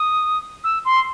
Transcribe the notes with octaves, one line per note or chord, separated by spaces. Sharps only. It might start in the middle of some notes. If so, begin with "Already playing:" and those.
Already playing: D#6
E6
C6